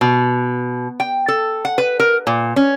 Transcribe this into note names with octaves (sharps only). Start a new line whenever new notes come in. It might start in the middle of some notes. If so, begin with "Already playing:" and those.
B2
G5
A4
F#5
B4
A#4
A#2
C#4